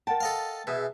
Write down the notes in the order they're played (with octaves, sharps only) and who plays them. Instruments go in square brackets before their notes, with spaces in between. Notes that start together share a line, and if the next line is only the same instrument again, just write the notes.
[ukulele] A#4 F#5 G5 [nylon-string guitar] A5 [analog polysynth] A6
[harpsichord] A4 D#5 F5
[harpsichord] B2 [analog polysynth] G#4 E5